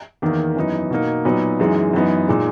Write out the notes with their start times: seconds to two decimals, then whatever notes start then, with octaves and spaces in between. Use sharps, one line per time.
0.22 E2 D#3 A#3
0.56 F#2 E3 B3 D#4
0.90 B2 A#3 D#4
1.25 A#2 F#3 B3 D#4
1.60 F#2 E3 G#3 D#4
1.93 F#2 E3 B3 D#4
2.28 A#2 G#3 D#4